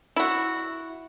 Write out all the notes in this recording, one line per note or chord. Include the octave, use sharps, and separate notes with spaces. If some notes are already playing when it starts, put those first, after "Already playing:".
E4 F#4